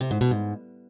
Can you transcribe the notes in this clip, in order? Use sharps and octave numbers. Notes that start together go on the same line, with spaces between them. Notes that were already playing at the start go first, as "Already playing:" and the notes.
C3
G#2
B2
G#2